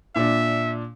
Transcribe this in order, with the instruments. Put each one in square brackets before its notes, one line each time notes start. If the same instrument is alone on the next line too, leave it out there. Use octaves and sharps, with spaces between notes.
[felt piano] A#2 D4 [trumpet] E5